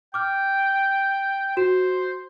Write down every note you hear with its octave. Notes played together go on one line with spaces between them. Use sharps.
G5 D6 F6
F#4 C5 E7